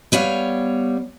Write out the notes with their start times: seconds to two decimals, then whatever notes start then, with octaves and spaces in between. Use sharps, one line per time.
0.12 G3 B3 C#5 F5